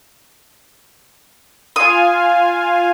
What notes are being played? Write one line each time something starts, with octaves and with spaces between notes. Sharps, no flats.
F4 F5 G#5 D#6